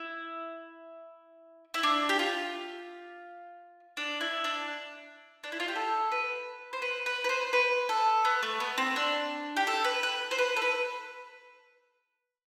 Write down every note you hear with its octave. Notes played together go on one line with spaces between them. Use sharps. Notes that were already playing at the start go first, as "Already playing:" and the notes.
Already playing: E4
E4
D4
G4
F4
D4
E4
D4
D4
E4
F4
G4
A4
B4
C5
B4
B4
B4
C5
B4
A4
B3
A3
B3
C4
D4
G4
A4
B4
B4
C5
B4
A4
B4